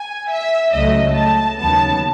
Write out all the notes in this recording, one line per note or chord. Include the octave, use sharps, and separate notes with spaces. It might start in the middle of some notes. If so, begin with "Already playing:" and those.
Already playing: G#5
E5
C#2 C#3 F#3 A3 D#5
A5
D#2 C#3 F#3 B3 A5